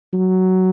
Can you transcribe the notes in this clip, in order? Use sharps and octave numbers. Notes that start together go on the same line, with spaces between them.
F#3